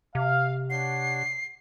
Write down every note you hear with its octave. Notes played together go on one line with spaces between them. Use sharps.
C3 F5
D4 C#5 F#5 C7